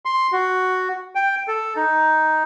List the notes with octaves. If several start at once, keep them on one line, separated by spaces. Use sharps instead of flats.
C6
F#4
G5
A4
D#4